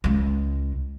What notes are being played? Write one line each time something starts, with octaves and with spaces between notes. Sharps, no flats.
C#2 G#3